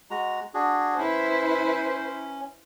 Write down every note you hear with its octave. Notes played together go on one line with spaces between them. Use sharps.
G#3 F#4 A#5
D4 F#4 G#4
C#4 E4 B4 C5